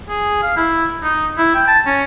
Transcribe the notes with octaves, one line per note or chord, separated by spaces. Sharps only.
G#4
F5
E4
D#4
E4
G5
A5
C#4